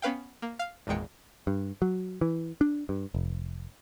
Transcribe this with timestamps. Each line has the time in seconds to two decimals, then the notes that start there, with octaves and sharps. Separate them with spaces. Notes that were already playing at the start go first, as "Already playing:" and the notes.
0.02 B3 C#4 B4 F5 G5
0.42 A#3
0.59 F5 F6
0.87 G#1 E2 A#2 G#3 G5 C#7
1.47 G2
1.82 F#3
2.21 E3
2.61 D4
2.89 G2
3.14 F1